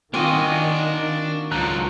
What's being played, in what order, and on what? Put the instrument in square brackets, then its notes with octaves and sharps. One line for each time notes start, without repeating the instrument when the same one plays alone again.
[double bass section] D#3 [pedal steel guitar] A#3 F#4 D#5 [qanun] C4 F4 [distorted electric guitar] D4 G#5
[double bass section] C#2 [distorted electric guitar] D3 F3 [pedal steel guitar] F#3 A#5 F#6